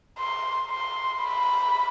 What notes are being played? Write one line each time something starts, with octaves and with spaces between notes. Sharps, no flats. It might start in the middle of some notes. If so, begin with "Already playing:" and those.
C6
C6
B5